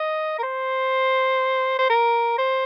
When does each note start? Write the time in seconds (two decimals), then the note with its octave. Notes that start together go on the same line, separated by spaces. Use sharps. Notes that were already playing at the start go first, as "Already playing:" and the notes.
Already playing: D#5
0.39 A#4
0.43 C5
1.79 C5
1.90 A#4
2.38 C5